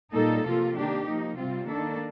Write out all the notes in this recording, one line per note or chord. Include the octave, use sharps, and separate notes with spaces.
A#2 G3 A#3 D#4 A4
C3 F3 A#3 F4
D#3 A#3 D4 G4
F3 A#3 D#4
C3 G3 C4 F4
D#3 A#3 D4 A4